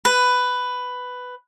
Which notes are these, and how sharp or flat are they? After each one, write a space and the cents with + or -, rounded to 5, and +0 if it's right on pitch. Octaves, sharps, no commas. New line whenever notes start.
B4 +10